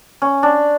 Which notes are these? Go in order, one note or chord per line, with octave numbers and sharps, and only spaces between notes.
C#4
D4